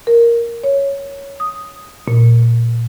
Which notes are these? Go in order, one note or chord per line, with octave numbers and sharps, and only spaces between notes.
A#4
C#5
D#6
A#2